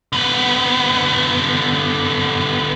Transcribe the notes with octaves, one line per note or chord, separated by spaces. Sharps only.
D3 B3